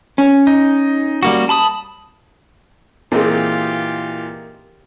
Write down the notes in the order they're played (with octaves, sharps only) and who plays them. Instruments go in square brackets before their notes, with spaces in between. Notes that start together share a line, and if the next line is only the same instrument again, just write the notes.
[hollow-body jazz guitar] C#4
[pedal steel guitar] D#4
G3 A#3 F#4
A5 B5 D#6
[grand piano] A#2 E3 [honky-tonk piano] A#3 D#4 [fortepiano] C4 G#4 [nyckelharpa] F4 G4